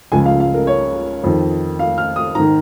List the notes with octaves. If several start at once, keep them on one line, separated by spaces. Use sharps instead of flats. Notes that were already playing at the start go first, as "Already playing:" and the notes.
C#2 C#3 F3 G#5
F5
F5
A#4
C#5
F2 D#3
F5
F6
D#6
G#2 D#3 A#5